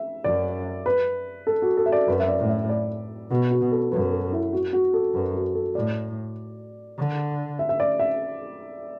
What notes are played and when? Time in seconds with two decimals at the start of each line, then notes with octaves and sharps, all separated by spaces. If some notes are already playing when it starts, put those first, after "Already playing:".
Already playing: E5
0.24 F#2 D5
0.86 B4
1.47 A4
1.62 F#4
1.77 A4
1.86 E5
1.92 D5
2.08 F#2 B4
2.20 E5
2.28 D5
2.39 A2
2.49 E5
2.69 D5
3.30 B2 F#4
3.51 F#4
3.61 B2
3.71 A4
3.92 F#2 B4
4.12 A4
4.32 E4
4.53 F#4
4.73 F#4
4.94 A4
5.14 F#2 B4
5.35 F#4
5.55 A4
5.75 A2 D5
6.98 D3
7.59 E5
7.69 E5
7.80 D5
7.99 E5